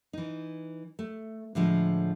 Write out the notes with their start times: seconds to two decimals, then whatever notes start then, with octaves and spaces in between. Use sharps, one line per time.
0.13 E3 D#4
0.99 A3
1.55 A2 D3 F3 G#3